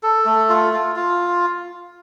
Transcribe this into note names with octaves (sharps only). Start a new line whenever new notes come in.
A4
A3
F4
F4
F4